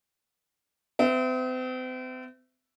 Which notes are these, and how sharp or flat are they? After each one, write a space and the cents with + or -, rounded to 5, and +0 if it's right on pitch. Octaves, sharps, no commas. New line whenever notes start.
C4 -40 E5 +10